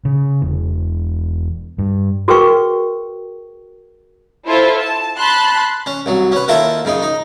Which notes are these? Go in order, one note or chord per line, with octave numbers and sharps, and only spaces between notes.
C#3
E1
G2
F#4 G#4 A#4 B4 G5 C#6
E4 F4 A4 C5
A5
A5 B5 C6 F#6
C#4
C2 F#3
C#4 B4
D#2 E4 F4 A4 E5 A#5
F#2 C#3 D#4
D#4